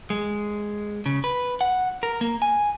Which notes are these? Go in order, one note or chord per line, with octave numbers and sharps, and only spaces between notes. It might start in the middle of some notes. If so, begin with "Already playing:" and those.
G#3
C#3
B4
F#5
A#4
A#3
G#5